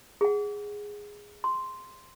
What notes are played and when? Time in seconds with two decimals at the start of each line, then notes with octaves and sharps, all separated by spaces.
0.21 G#4 F#5
1.44 C6